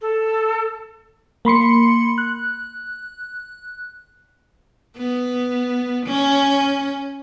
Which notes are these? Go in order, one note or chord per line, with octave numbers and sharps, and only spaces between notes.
A4
A#3 B5 C6 C#7
F#6
B3
C#4